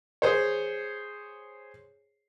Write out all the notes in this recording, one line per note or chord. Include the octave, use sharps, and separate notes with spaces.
G#4 C5 C#5